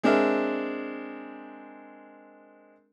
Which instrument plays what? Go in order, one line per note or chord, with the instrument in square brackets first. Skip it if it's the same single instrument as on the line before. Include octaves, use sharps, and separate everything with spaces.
[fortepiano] G#3 C4 D4 A#4 E5